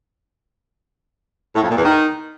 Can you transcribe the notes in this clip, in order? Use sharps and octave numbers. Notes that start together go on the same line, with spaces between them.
A2
F2
A#2
E2
D#3